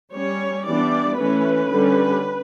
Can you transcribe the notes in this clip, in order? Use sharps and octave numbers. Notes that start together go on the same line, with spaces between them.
G3 C#4 C#5
E3 G3 B3 D4 D5
E3 A3 C#4 B4
D3 G3 C#4